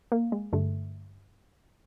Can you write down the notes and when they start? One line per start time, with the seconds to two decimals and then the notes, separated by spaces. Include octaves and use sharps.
0.12 A#3
0.32 G#3
0.53 G2 D3 A3